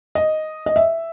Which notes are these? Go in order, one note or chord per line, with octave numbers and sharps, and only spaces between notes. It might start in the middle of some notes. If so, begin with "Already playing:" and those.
D#5
D#5
E5